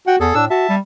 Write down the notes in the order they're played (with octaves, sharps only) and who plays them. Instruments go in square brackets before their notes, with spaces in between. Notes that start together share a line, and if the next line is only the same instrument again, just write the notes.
[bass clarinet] F#4 [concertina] F#5 G5
[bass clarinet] E2 [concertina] G#4 A4
[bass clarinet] A2 [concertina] D4 E6
[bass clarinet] F#4 [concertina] E5 A5
[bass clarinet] G3